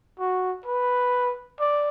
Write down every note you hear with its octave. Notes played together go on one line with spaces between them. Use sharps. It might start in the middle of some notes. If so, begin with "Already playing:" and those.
F#4
B4
D5